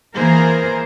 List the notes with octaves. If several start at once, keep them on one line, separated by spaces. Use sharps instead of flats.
E3 A#3 G#4 A#4 C5